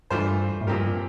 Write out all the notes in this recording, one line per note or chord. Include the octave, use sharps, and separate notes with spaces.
G2 E3 A3 D4 F4 C5
A2
G2 A#2 F3 C4 G4 A#4